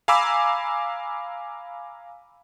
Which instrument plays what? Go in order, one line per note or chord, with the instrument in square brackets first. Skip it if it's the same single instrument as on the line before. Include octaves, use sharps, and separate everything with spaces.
[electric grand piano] F5 G#5 A#5 B5 D6 E6